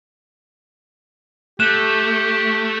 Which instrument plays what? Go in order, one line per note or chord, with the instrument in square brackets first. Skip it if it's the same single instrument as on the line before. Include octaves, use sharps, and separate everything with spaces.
[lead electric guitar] A3 [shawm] G4 [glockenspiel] F#6 E7